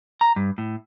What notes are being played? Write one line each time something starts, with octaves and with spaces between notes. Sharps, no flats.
A#5
G2
A2